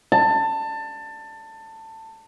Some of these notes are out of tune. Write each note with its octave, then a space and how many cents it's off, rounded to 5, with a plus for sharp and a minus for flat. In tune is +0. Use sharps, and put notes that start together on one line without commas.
A5 +20